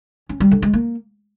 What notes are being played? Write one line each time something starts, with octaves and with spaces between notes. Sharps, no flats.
C#4
G3
D3
G#3
A#3